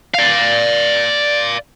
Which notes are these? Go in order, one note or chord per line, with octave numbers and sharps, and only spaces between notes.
D5 F5